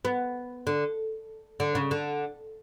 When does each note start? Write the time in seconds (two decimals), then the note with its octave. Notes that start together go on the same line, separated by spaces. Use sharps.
0.05 B3
0.67 D3
1.60 D3
1.75 C#3
1.91 D3